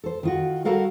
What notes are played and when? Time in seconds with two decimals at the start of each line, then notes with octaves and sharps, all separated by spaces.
0.04 A4 C5
0.23 D#3 F4 F#4
0.65 G3 F#4 A4 A#4 F5 F#5